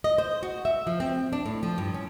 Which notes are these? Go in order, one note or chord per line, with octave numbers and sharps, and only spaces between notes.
D#5
C5
F#4
E5
F3
C4
D4
A2
F3
G2
C#4